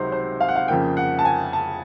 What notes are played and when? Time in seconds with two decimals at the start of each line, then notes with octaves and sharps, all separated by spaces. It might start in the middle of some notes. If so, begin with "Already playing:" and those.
Already playing: C#2 C3 D#3 F#3 C5
0.12 C5
0.40 F5
0.48 F#5
0.55 F5
0.68 F2 C#3 F3 A#3 G5
0.97 F#5
1.19 A5
1.25 G#5
1.53 A5